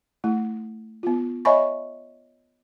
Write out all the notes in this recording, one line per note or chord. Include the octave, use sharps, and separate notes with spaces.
A3 E4
B3 F4
C#5 D#5 E5 G#5 B5 C#6